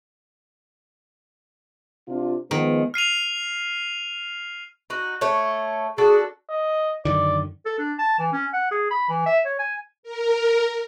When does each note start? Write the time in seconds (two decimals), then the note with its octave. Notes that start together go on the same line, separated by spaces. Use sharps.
2.08 C3 D4 F4
2.51 D#3 F3 G#3 B3
2.94 F6 C7 D#7 F7
4.90 D#4 F#4
5.21 A3 C#5
5.98 D4 F#4 G#4 A4
6.50 D#5
7.05 F#2 D3 D#3 D5
7.66 A4
7.79 D4
7.99 A5
8.19 E3
8.33 C#4
8.53 F#5
8.71 G#4
8.91 B5
9.09 E3
9.26 E5
9.46 C#5
9.59 G#5
10.03 A#4